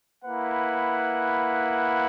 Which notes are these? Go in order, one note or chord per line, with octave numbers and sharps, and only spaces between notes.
A#3 E4 B4 F#5